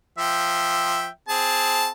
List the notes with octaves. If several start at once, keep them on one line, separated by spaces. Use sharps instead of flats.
F3 E5 G5
C4 G#4 A5